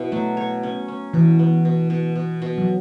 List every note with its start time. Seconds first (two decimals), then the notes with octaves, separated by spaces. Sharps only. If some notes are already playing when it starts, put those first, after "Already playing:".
Already playing: B2 E4
0.12 F#3 A3
0.37 C#5
0.63 C#4
0.88 C#4
1.13 B2 E3
1.39 B3
1.65 B2
1.90 B2
2.16 B2
2.42 B2
2.58 F#3